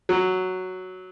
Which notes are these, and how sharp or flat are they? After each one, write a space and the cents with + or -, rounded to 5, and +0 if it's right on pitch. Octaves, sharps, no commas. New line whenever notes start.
F#3 +0